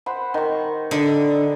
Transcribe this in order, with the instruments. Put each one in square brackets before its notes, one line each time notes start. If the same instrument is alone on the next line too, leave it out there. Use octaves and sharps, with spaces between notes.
[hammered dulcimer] C5 F#5 B5
D#3 C#6
[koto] D3 [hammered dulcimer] D#5